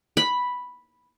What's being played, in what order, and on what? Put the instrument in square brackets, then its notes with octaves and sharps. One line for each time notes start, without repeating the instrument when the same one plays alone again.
[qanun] B5